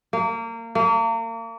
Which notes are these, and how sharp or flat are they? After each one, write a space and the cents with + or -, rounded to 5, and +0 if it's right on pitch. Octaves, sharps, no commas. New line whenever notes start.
A#3 -25
A#3 -35